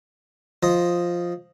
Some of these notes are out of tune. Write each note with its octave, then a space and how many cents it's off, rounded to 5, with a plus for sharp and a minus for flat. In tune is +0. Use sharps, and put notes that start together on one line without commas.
F3 +0 D#5 +0